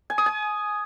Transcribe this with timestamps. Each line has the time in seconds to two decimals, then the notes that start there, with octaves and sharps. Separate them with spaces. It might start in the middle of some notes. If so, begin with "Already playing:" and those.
0.10 G#5
0.18 D#6
0.26 G#5